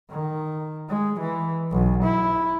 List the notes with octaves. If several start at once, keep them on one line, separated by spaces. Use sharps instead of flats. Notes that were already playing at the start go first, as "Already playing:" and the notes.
D#3
G#3
E3
B1
E4